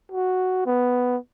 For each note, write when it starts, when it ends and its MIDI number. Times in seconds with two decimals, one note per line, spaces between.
0.12 0.63 66
0.66 1.17 59